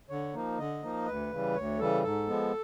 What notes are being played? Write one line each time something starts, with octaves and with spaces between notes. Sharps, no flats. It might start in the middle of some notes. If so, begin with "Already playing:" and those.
D3 C#5
F3 A#3 D#4
D3 D#5
F3 A#3 D#4
D2 B4
C#3 E3 G3
D2 C#5
C#3 E3 G3 A4
G#2 A4
F3 G#3 B3